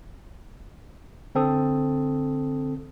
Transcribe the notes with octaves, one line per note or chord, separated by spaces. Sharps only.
D3 C4 A4 D#6